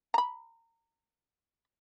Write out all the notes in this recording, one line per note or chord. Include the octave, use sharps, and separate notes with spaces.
A#5 B5